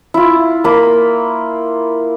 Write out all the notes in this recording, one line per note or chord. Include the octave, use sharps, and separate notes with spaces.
E4 F4
A#3 B5